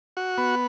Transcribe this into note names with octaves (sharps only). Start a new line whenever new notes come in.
F#4
B3